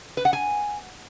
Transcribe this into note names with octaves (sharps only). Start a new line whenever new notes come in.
B4
F#5
G#5